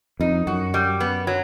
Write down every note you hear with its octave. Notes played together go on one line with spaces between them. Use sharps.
F2 D#4
F#2 F#4
G3
B3
F#3